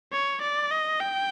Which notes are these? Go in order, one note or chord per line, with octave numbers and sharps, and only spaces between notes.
C#5
D5
D#5
G5